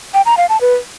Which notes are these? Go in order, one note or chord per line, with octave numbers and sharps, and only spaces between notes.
G5
A#5
F5
A5
B4